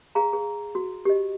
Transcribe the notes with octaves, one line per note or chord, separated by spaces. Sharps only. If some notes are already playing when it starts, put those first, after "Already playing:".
G#4 F5 A#5
G#4
F#4
G4 D#5